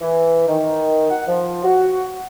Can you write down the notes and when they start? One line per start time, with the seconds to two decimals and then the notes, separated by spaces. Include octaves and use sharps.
0.01 E3
0.48 D#3
1.10 F#5
1.27 F3
1.64 F#4